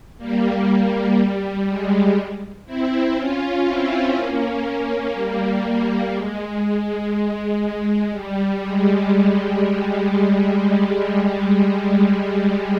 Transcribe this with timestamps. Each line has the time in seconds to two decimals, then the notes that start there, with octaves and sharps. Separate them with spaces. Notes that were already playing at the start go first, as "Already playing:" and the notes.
0.18 G3 A#3
0.69 G3
1.67 G#3
2.66 C4 E4
3.15 C#4 F4
3.65 C4 E4
4.15 A#3 C#4
5.13 G3 A#3
5.63 G3 A#3
6.13 G#3
6.63 G#3
8.11 G3
8.60 G#3